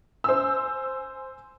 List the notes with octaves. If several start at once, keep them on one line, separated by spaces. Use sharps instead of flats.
C5 G#5 E6